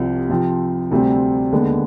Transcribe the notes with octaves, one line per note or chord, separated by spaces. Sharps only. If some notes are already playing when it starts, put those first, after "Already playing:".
Already playing: C2 C3 F3
C3 F3 C4
D2 C3 G3 C4
D#2 D3 G#3 B3